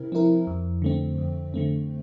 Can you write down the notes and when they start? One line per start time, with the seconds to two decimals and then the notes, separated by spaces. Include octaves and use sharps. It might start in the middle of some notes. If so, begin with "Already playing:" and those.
Already playing: C3 C4 E4 A#4
0.12 F3 C4 E4 A#4
0.47 F2
0.82 D3 A3 C4
1.18 F2
1.54 D3 A3 C4